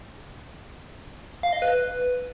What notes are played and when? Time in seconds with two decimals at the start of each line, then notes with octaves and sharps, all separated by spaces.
1.43 F5
1.53 D#5
1.62 B4